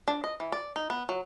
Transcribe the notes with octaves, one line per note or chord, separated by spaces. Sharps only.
D4
D#5
E3
D5
D#4
B3
F#3